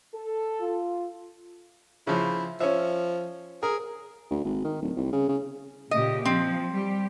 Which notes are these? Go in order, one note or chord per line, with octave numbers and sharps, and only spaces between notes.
A4
F4
C#3 F3 E4
F3 C#4 E5
G#4 A#4
D2
G#1
D#3
D1
C2
C#3
C#3
A#2 C#3 G4 D#5
F3 C4
G3 G4